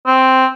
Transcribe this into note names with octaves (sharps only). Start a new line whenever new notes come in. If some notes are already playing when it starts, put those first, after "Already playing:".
C4